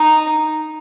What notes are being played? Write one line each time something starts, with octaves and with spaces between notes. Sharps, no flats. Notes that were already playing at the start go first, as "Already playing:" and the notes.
Already playing: D#4